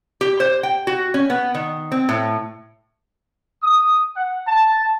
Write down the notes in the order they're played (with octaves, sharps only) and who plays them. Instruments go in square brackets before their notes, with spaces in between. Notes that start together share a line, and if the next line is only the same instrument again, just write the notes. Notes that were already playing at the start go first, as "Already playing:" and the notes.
[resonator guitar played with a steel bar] G4
C5
G5
F#4
C#4
B3
D#3
C4
A2
[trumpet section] D#6
F#5
A5